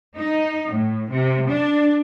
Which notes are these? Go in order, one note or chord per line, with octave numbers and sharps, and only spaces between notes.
D#4
A2
C3
D4